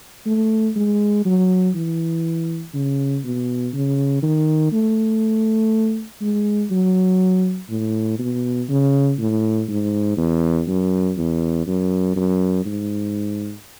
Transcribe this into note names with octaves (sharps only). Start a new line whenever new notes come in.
A3
G#3
F#3
E3
C#3
B2
C#3
D#3
A3
G#3
F#3
A2
B2
C#3
A2
G#2
E2
F#2
E2
F#2
F#2
G#2